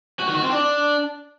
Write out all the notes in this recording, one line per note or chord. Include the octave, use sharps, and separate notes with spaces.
F#4
D#3
F#4
C4
D4